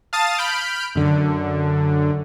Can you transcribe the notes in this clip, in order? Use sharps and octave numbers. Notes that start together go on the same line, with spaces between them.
F5 A5 D#6 A6
B5 F6 G6 D7
F#2 D3